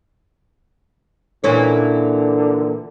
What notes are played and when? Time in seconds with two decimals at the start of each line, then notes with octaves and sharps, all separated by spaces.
1.44 A#2 D3 E3 C#4